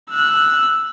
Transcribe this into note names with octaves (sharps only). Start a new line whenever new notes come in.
E6 F#6